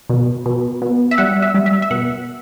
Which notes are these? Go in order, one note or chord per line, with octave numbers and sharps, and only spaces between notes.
B2
B2
B2
E5
G3 F#5
E5
G3
E5
E5
B2 F#5